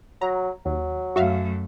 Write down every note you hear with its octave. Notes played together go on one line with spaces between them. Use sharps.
F#3 A#5
D#2 F#3
F#2 A3 F#4 E5 F5